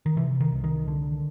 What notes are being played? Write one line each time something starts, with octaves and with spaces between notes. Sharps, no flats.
D#3
C3 E3
D#3
C2
D#3
D3